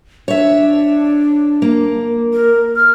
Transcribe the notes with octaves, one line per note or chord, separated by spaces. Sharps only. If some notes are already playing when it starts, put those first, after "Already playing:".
D4 C#5 E5
A#3
A#4
F6